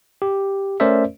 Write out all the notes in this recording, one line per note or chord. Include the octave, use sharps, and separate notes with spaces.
G4
A3 C#4 A#4 C5 D5 E5